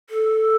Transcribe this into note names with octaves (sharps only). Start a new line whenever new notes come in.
A4